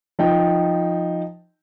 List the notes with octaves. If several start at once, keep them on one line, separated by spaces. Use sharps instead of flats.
F3 D#4 G5